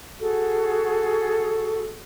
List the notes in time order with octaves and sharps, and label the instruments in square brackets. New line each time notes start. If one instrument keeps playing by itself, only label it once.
[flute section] F#4 G#4 A4